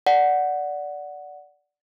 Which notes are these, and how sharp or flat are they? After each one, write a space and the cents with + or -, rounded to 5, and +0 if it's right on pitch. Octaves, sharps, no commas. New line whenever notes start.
D5 -10 F#5 +0